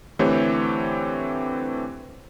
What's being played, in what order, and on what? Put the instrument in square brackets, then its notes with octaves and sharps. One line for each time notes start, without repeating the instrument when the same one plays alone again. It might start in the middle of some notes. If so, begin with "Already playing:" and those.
[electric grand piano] D3 E3 A3 C4 G4 C#5